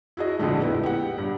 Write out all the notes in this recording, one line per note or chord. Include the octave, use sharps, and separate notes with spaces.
E4 F#4 G#4 D#5
A#1 F2 A2 D3 G#3 A3
B3 E4
G4 F#5
G2